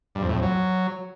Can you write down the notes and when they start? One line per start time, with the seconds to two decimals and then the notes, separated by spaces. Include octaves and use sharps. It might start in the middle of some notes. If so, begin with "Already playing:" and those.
0.15 G2
0.22 F2
0.29 A2
0.35 F2
0.42 F#3